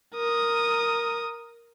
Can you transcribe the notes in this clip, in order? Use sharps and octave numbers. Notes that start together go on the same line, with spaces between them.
A#4 D#6